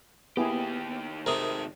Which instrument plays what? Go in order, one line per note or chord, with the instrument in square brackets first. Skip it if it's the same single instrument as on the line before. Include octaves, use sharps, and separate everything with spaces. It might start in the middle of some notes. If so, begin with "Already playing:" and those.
[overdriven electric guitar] D#3 G4 [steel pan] A#3 E4 G#4 [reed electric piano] B3
[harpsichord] C3 A3 [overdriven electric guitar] D#3 G#3 [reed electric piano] A#4 D#6